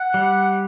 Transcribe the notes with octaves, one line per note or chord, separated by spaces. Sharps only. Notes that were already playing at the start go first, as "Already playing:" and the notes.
Already playing: F#5
G3